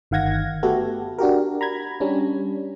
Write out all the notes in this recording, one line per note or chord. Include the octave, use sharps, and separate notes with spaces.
G1 D#3 F5 F#5 G#6 A#6
A3 B3 F#4 G4 A4
D4 F#4 G4 A#4
A#5 B5 G#6
G3 C#4 D4